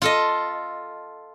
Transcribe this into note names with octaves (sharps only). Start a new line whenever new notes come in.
F4 A4 D#5